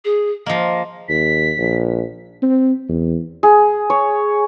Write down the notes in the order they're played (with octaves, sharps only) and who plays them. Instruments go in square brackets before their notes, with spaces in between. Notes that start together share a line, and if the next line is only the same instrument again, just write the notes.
[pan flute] G#4
[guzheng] F3 A#3 [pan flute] D#5
[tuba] D#2 [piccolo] B6
[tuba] A#1
C4
E2
[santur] G#4
C#5